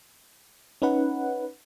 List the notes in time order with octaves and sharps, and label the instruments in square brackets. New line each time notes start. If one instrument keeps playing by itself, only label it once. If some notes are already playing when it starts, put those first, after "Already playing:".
[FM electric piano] C#4 D#4 B4 F#5